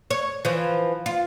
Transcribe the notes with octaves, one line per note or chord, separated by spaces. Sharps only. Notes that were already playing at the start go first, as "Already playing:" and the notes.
C#5
E3 F3
F4